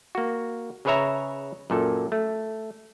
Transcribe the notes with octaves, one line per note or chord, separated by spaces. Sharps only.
A#3 F#4
C#3 G#4 B4 C#5 E5 A#5
F#2 A#2 A4
A3